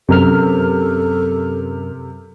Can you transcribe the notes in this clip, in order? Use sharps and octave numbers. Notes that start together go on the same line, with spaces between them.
F#2 C3 A4 A#4 F6